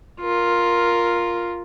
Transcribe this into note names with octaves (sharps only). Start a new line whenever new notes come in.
F4 A#4